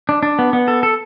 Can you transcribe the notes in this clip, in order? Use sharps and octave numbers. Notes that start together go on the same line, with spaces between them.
D4
D4
B3
B3
A4
A4